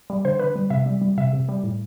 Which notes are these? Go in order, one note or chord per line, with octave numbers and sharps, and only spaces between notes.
G3
D3 C5
D3 B4
G3
C3 E5
G3
G3
C3 E5
C3
G3
A2